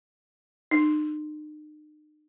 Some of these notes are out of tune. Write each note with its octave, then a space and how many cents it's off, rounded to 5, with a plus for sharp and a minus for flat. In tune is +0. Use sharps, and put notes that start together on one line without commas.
D#4 -40